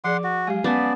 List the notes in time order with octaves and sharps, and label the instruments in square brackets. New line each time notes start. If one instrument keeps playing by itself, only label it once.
[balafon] F3 G#4 D5 [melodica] F#5 C6 [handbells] D6
[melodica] F#4
[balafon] F#3 G#3 G4 [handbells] F5 G#5
[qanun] B3 [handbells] C#4 A5 [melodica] D5